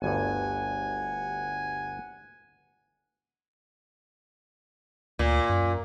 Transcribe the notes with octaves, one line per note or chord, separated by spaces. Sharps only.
G1 D2 G2 F#5 G#5
D2 A#2
F#2